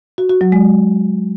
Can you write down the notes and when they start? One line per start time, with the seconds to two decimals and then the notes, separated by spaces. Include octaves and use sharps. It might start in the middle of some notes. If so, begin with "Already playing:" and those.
0.18 F#4
0.30 F#4
0.41 F#3
0.52 G#3